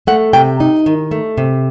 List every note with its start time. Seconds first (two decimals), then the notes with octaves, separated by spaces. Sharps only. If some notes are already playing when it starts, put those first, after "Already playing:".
0.07 A3 F#5
0.33 C3 G5
0.60 D#4
0.86 D#3
1.11 A3
1.37 C3